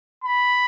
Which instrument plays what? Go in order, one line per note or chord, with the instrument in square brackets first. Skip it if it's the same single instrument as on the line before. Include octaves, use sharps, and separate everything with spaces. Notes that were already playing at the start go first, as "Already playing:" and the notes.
[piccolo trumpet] B5